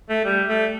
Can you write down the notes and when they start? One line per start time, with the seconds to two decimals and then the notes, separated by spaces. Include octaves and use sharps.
0.09 A3
0.25 G3
0.49 A3